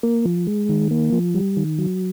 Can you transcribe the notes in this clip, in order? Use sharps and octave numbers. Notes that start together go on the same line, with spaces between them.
A#3
F3
G#3
D#3
A#3
F3
G3
D#3
F#3